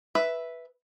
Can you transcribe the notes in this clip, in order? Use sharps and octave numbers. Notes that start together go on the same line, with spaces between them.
B4 E5